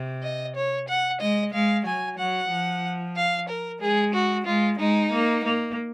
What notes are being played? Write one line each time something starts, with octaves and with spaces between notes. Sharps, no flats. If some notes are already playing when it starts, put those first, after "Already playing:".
Already playing: C3
D#5
C#5
F#5
G#3 D#5
G#3 F5
F#3 G#5
F#3 F#5
F3
F5
A#4
G#3 G#4
F#4
G#3 F4
G#3 D#4
A#3
A#3